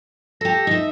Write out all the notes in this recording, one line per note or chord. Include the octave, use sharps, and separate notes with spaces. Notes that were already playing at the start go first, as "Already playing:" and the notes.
G4 A4 A#6
D#4 E5